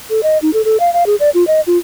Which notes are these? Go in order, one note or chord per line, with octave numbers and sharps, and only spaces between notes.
A4
D#5
D#4
A4
A4
F5
F5
G#4
D5
F4
D#5
F4